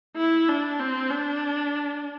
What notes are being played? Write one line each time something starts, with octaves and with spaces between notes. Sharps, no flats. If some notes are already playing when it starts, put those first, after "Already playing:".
E4
D4
C4
D4